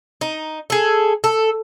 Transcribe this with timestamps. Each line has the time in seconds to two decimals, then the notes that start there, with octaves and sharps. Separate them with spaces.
0.21 D#4
0.70 G#4 A4
1.24 A4